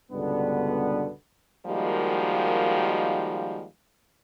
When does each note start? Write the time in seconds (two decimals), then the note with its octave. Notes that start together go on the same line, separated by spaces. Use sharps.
0.11 C#2 G2 B2 D3 G3 B3
1.66 D#3 F3 G3 G#3 A#3 F#4